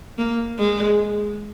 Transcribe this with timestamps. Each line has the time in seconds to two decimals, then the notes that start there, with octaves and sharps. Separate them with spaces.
0.18 A#3
0.58 G#3